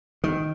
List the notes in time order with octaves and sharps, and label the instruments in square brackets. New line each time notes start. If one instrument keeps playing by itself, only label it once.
[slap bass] D#3